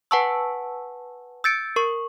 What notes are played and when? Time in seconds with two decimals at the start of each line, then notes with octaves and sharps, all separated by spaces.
0.11 B4 F#5 G#5 A5 C#6 E6
1.44 E6 G6 A6 C#7 D7
1.76 A#4 C#6